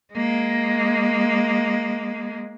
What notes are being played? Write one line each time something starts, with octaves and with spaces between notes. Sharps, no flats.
G#3 A#3